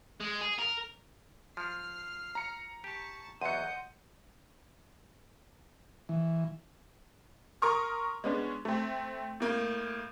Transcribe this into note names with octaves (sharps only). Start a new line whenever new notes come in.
G#3
G#4
A#4
F3 F6 C7
A#5 C#7
G4 A5 C#6
E2 F#3 D#5 F#5 C6 G6 C#7 D#7
E3
A#4 A#5 C6 C#6 D#6 F6
G#3 B3 C#4 D4
A3 C4
A2 A#3